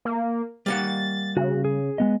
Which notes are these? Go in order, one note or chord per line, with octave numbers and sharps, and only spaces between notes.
A#3
G3 A#3 F#5 A6
C#3 F#4
G#4
G#3 B3 D#5